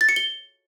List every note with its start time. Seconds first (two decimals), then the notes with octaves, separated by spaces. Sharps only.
0.01 A6
0.09 C#7
0.16 G7